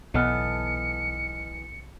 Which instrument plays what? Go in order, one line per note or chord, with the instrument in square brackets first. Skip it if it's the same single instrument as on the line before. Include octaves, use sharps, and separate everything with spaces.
[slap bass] B1 F#3 [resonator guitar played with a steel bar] E3 B3 A4 [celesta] D#5 F6 [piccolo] C#7